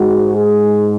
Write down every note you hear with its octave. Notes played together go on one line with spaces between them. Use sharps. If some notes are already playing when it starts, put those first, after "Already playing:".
Already playing: G#2 G#3 F#4
G#4